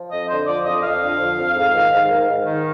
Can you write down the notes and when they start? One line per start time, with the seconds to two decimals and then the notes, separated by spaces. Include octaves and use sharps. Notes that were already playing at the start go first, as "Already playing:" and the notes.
Already playing: F3
0.12 F2 D#5
0.29 D3 C5
0.48 F3 D5
0.66 F2 D#5
0.83 F2 F5
1.02 D3
1.20 F3
1.38 F2
1.56 G#2
1.74 D#3
1.92 G#2
2.10 D#3
2.28 G#2
2.46 D#3